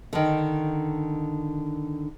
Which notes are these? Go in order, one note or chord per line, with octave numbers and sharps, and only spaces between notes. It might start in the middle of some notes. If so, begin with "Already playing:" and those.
D3 D#3